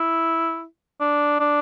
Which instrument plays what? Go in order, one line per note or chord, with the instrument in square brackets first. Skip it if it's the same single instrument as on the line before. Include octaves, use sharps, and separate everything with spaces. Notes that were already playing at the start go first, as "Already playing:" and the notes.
Already playing: [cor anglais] E4
D4
D4